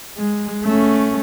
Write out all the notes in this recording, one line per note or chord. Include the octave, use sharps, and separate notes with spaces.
G#3
A3 C#4